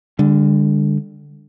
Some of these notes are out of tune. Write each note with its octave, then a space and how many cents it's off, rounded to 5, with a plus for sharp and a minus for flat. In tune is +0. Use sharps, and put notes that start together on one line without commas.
D3 +0 G3 +45